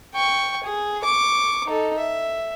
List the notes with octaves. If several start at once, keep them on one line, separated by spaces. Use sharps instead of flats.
G5 C#6
G#4
C#6 D6
D#4 A4
E5